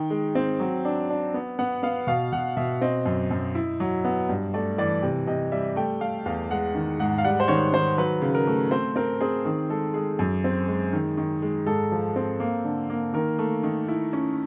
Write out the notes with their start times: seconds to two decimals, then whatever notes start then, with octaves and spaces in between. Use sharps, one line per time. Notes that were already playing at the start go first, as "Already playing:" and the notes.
Already playing: D#3 G5
0.10 G#3
0.35 C4
0.60 F#3
0.85 D4
1.09 D4
1.34 B3
1.59 B3 F#5
1.83 B3 F5
2.07 B2 F5
2.33 B2 F#5
2.57 B2 E5
2.81 C4 D#5
3.06 F#2
3.31 F#2
3.55 E4
3.80 F#3
4.05 B3
4.29 G2
4.54 A3 D5
4.78 E3 D5
5.03 C3
5.27 C3 D#5
5.52 G3 E5
5.76 A3 G5
6.00 A3 F5
6.26 E2 F5
6.51 G#3 F#5
6.75 D#3
7.00 G#2 F#5
7.18 F5
7.24 G3 F#5
7.40 C5
7.48 D#3 C#5
7.73 D#3 C5
7.98 F#3 B4
8.22 C#3
8.35 A#4
8.47 A3
8.71 C4 C5
8.96 C4 A#4
9.21 C4 G#4
9.45 D#3 G#4
9.69 G#3 A4
9.94 G#3 G#4
10.19 F#2
10.44 C4
10.68 G#3
10.93 D#3
11.17 D#3
11.42 G#3
11.66 G#2 A4
11.92 F3
12.16 C4
12.40 A#3
12.64 D3
12.90 A#3
13.14 D#3 A#4
13.39 A3
13.63 D#3
13.88 E4
14.13 C#4